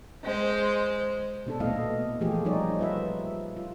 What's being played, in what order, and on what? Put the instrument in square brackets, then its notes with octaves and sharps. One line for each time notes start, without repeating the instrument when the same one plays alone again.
[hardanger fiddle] G#3 C5
[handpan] B2 D4 A4
A#2 A3 B3 E4 D#5 F5
E3 F3 A3 F4 G4 G#4
F3 G3 D4 D#4 C#5 D5
F4 B4 E5
F4